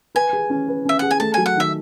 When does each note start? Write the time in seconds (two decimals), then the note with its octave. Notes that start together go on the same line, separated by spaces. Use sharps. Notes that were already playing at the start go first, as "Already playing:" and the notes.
0.15 B4 G#5
0.33 G#4
0.50 C#4
0.68 B4
0.85 C#4 E5
0.99 G#4 F#5
1.11 G#5
1.20 A3 A5
1.34 F#3 G#5
1.46 F#5
1.55 D#3 E5